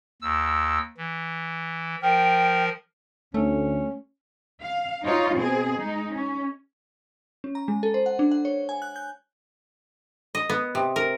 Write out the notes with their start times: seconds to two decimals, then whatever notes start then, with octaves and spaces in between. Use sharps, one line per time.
0.22 D#2 E6
0.98 E3
2.02 F3 A#4 G5
3.34 D2 A3 C#4
4.63 F5
5.03 D#4 F4 C#5
5.34 B2 C4 G#4
5.76 G#3 D#4
6.11 C#4
7.44 C#4
7.55 A#5
7.68 G#3
7.83 A4
7.94 C5
8.06 F#5
8.19 D4
8.31 F#5
8.45 C#5
8.69 G#5
8.82 F#6
8.96 G6
10.35 D#5
10.49 B3
10.75 C3
10.96 A#4